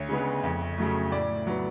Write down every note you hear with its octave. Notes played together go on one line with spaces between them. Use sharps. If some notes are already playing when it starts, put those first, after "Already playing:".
Already playing: D2 C#5
C#3 G#3 B3
F2
C#3 F#3 A3
A2 D5
F#3 B3